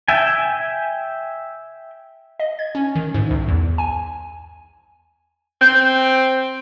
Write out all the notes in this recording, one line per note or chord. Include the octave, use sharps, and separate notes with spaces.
E5 G5 G#5
D#5
G#6
C#4
D#3
G#2
C2
E2
G#5
C4 G6